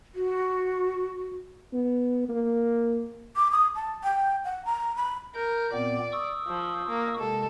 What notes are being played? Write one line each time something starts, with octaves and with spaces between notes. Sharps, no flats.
F#4
B3
A#3
D6
D#6
A5
G5
F#5
A#5
B5
A#4 G6
A#2 B3 C4 D5
C#6 D#6 E6
F3
A#3
C3 G#3 A4